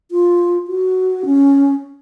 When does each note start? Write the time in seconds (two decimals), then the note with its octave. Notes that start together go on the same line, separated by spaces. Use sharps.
0.11 F4
0.68 F#4
1.25 C#4